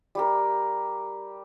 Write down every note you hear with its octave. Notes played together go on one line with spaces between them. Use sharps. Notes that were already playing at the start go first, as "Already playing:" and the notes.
G3 G4 A#4